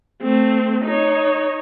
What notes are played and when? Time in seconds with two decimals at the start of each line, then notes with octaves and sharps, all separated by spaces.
0.22 A3 C4
0.85 D#4 C#5